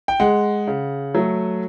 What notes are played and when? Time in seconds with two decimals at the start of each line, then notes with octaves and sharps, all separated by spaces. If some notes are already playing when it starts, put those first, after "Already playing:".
0.08 G5
0.20 G#3 F#5
0.68 C#3
1.14 F#3 A3